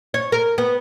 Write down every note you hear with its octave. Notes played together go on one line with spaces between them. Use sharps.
C#5
A#4
B3